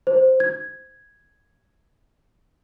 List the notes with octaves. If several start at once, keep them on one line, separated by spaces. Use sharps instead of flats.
C5
G#6